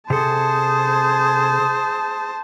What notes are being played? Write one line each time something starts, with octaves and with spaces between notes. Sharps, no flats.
C3 G#4 A4 C5 A5